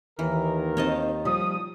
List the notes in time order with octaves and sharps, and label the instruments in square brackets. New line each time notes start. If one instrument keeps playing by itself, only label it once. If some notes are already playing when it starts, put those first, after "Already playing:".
[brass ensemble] D#2 D#3 [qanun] E3 [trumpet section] A#4
[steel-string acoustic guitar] C4 D#4 [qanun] C#5 D#5 A5
[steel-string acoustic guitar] F3 G3 [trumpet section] D#6